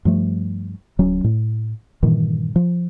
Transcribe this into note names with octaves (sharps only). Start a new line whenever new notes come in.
G2 F3 A3
D1 F#3 C#4
A2
G2 A#2 D#3 E3
F3